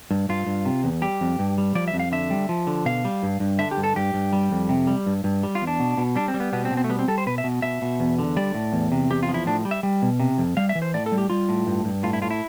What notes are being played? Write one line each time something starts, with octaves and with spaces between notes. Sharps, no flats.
G2
G2 F4
G2
C3
E2
G3 G4
F2
G2
G3
F3 D5
E5
F2
F5
D3 E5
G3
F3
D3
B2 F5
G3
G2
G2
D3 E5
G4
G2
A4
G2 G4
G2
G3
F2
C3
G3
G2
G2
G3
F4
E2
D4
B2
B2
G3 D4
C4
G3
B3
B2 B3
C4
B2
C4
A3
G3 B3
C4
G3 A4
C5
B2 B4
E5
B2
B2 E5
B2
E2
D3
G3 D5
A2
E2
C3
E2 G4
F4
F3
E4
A2 D4
G3
E5
G3
B2
C3
F2
G3 F5
E5
E3
C5
A2 D5
A4
G3
G4
G3 F4
A2
G2
G2
A2 F4
E4
A2 F4
E4